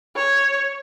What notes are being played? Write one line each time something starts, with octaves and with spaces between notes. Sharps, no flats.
C#5